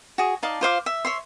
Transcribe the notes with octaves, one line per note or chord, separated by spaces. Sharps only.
F#4 G#4
D#4 D5 F5 A5
F4 C5 F5 D6
E5
C#5 E5 C6